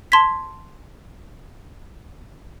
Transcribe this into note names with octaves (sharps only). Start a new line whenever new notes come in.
A5 C6 G#6 B6